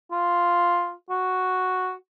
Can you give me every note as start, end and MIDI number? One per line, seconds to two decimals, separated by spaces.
0.11 0.94 65
1.10 1.93 66